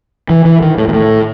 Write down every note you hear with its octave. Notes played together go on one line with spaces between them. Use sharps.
E3
E3
D#3
A2
A#2
A2